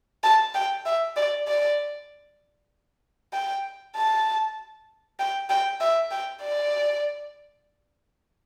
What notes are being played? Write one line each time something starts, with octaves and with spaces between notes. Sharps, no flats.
A5
G5
E5
D5
D5
G5
A5
G5
G5
E5
G5
D5